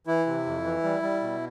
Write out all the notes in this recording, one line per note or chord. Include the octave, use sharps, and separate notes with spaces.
E3 E4
C3
F2
E3
G3
G3
B2